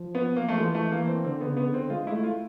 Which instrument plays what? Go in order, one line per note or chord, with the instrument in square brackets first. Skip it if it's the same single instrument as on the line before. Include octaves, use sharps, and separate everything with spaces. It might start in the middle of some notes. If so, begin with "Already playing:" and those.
Already playing: [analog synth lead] F3
[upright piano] B3
A#3
[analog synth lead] F3 [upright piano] A3
[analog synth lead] E3 [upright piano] G#3
[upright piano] A3
[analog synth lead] E3 [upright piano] A#3
[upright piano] C4
[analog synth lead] D3 [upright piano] C4
[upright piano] B3
[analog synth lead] C#3
[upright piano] B3
[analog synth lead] D3
[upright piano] C4
[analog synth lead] G#3 [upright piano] F4
[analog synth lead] A3 [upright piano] E4
[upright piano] F4